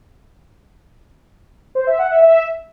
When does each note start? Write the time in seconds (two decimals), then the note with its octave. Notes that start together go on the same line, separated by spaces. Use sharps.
1.75 C5
1.87 E5
1.99 F#5
2.10 E5
2.22 E5